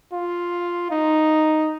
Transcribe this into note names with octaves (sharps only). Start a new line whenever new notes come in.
F4
D#4